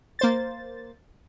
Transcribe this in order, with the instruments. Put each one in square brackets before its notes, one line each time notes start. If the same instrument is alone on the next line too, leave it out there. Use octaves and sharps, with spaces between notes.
[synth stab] A#3 C5 A6